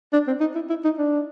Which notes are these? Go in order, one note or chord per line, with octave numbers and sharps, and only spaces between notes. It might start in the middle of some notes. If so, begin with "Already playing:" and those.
D4
C4
D#4
E4
E4
D#4
D4